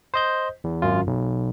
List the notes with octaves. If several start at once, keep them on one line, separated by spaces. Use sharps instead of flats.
C5 D#5 G6
E2
G#1 F#2 F4
B1